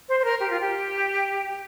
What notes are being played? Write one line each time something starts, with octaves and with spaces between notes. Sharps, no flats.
C5
C5
A#4
G4
F4
G4